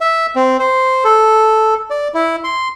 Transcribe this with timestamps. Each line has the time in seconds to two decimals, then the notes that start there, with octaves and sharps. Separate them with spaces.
0.01 E5
0.36 C4
0.59 C5
1.04 A4
1.90 D5
2.14 E4
2.44 C6